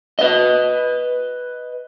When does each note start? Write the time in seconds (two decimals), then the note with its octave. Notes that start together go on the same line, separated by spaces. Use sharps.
0.19 B4 D#5